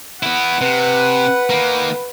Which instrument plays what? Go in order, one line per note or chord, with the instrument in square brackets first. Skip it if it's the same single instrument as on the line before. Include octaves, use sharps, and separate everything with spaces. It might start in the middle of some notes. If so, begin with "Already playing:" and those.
[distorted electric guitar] B3 E4 [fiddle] F#5
[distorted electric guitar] C3 [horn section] B4
[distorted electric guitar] D#3 A#3